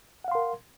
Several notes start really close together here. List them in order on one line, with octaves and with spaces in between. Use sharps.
F#5 F5 C6 A#4